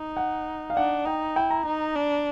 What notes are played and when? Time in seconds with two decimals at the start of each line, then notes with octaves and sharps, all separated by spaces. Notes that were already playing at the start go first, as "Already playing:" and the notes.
Already playing: D#4
0.17 F#5
0.70 F5
0.76 D4 F#5
1.05 D#4 G5
1.36 E4 G5
1.50 A#5
1.66 D#4
1.96 D4